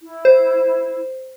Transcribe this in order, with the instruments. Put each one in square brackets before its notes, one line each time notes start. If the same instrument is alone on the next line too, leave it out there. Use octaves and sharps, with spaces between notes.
[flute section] E4
[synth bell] C5